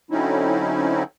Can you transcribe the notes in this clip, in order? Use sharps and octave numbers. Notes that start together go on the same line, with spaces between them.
D3 F#3 C4 C#4 D#4 E4